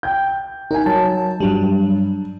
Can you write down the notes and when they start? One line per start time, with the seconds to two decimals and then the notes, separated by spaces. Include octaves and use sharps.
0.03 G5 G6
0.71 D#4 A#4 G#5
0.86 F#3 A5
1.40 G2 F#3 G3 D4